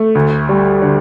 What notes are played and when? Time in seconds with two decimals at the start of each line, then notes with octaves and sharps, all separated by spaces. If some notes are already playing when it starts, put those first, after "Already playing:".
Already playing: A3
0.15 D2
0.49 G3
0.82 D3